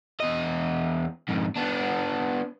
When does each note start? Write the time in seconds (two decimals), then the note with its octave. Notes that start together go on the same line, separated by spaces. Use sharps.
0.20 E2 D#5
1.28 F2 G#2
1.56 B3 D4